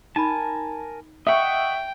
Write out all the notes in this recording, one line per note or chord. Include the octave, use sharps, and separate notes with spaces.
D#4 A#4 G#5 A5 B5
D#5 E5 F#5 G5 C#6